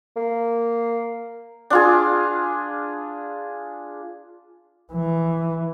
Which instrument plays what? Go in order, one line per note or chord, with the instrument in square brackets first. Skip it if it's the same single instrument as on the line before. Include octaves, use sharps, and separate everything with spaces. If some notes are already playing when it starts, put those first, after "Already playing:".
[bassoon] A#3
[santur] D4 F4 G#4
[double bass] E3